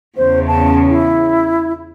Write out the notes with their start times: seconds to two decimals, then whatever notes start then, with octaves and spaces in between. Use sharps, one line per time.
0.17 E2 C#3 C5
0.48 A5
0.88 E4